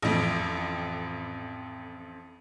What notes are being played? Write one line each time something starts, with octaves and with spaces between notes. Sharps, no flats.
A1 F2